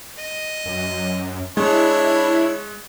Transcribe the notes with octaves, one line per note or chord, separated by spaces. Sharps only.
D#5
F#2
G#3 D4 E4 C#5